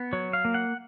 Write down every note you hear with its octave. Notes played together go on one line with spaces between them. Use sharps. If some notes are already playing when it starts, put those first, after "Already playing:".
Already playing: B3
F#3 C#5
F5
A#3
F#5